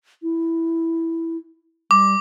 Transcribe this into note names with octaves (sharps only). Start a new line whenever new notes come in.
E4
G3 D6